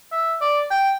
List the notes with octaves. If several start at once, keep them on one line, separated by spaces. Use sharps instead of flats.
E5
D5
G5